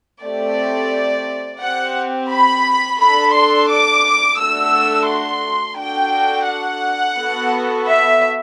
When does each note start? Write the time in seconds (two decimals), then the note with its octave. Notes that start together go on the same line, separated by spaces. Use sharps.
0.22 A3 C4 G4 D5
1.61 C4 G4 F#5
2.30 B5
3.00 D4 A4 B5
3.35 C6
3.70 D6
4.39 A3 D4 F#4 A4 E6
5.09 C6
5.78 D4 F#4 A4 G5
6.48 F#5
7.18 B3 F#4 A4
7.88 E5